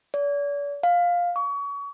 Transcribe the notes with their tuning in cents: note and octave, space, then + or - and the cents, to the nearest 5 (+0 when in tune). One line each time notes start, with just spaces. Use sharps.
D5 -45
F5 +10
C#6 +30